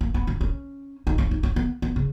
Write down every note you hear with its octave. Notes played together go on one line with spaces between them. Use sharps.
A#3
B3
C#4
C#4
D#4
C#4
D#4
C#4
B3
B3
C#3